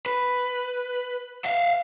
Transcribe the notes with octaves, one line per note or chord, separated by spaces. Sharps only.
B4
E5 F5